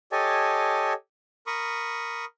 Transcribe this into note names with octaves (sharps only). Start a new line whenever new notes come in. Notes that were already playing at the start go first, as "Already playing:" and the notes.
G4 A4 C#5 D#5 G#5 A5
A#4 B5 C#6 D#6